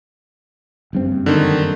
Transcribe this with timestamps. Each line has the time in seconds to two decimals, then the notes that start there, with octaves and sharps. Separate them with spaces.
0.93 F#1 G2 C4
1.26 D3 D#3